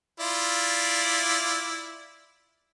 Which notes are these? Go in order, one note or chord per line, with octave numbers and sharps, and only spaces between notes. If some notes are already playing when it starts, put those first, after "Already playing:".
E4 F4 D5